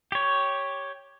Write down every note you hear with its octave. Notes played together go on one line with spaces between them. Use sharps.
G4 C#5